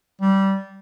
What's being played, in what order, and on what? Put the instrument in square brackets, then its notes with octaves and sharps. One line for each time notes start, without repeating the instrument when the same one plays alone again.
[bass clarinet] G3